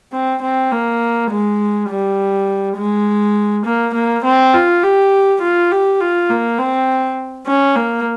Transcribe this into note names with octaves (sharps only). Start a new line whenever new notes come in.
C4
C4
A#3
G#3
G3
G#3
A#3
A#3
C4
F4
G4
F4
G4
F4
A#3
C4
C#4
A#3